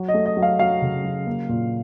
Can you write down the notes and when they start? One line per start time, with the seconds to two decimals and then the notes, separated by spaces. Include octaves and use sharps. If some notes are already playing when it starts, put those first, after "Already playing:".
Already playing: F#3
0.08 D#5
0.14 A3
0.26 D#5
0.37 F#3
0.42 F5
0.59 F#3 F5
0.82 C#3
1.04 F#3
1.27 A#3
1.49 A#2